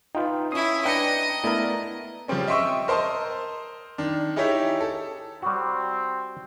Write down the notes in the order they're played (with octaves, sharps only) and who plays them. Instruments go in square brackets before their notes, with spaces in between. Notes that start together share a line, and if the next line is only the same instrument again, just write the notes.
[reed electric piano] D#4 F4 B4 [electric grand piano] G5
[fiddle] C#4 E4 [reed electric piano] D#6 [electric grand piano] C7
[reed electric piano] D4 B4 [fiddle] D#5 [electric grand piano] G5 A#5 C#7
[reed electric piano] A3 A#4 [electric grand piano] B3 E4 D5
[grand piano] C#3 F3 G3 C4 C#4
D#5 E5 G5 C6 C#6 E6
A#4 C5 D#5 A5 C6
D#3 D4
D#4 E4 G4 G#4 C#5 E5
A4
[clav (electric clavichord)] G3 F#4 [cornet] C4